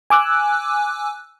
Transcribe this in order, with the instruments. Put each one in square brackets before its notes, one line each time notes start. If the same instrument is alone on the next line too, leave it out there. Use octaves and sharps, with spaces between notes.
[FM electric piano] G#5 D6 E6 F#6